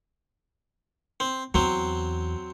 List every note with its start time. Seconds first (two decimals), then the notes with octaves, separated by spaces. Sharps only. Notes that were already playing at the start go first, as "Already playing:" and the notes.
1.20 C4
1.54 E2 F#3 C4